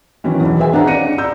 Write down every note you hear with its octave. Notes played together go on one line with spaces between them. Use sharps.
D#3 E3 F#3 C#4 E4
B1 E2
G#4 B4 C5 E5 G5 G#5
D4 D#4 G#4 F5 F#5 A#5
C#4 D5 A#6 C#7 D#7
D5 A#5 E6 G6